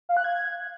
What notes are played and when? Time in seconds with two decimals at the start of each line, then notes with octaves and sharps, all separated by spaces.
0.09 F5
0.17 F#6
0.24 G#6